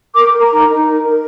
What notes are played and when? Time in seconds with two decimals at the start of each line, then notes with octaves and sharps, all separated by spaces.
0.15 A#4 D6
0.33 A#4
0.42 A#5
0.51 D#4
0.68 D#4
0.85 A#4
1.03 A#4